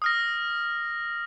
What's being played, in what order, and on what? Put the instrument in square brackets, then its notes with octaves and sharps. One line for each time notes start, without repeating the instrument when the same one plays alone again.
[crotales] D#6 F6 A#6